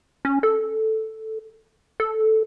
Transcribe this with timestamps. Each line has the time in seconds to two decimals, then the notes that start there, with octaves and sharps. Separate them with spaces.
0.25 C#4
0.43 A4
2.00 A4